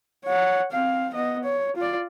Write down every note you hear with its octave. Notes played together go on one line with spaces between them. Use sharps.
C#5 F#5
C4 F5
B3 D#5
C#5
F4 D5